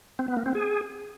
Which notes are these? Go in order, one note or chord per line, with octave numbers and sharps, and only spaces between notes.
C4
B3
A#3
C4
G#4